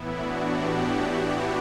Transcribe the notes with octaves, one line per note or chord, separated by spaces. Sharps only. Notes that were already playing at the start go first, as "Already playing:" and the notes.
Already playing: A2 E3 B3 E4
D4 F#4
E4 G4
D4 F#4
D4 F#4